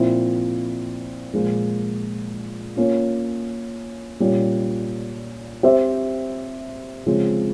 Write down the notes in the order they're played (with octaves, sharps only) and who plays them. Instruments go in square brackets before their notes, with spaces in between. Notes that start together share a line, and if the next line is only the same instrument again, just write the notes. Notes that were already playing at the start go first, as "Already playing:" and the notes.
Already playing: [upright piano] A#2 F3 C4 E4
A#2 F3 G#3
A#3 C#4 F4
A#2 G3 C#4
C4 G4 C5 E5
C#3 F3 G#3 C4